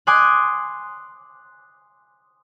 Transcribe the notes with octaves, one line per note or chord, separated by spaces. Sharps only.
G#5 C6 D6 D#6 F#6